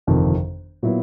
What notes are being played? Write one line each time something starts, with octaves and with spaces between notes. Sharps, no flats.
G1 F2 C3 D#3
A#2 F#3 B3 E4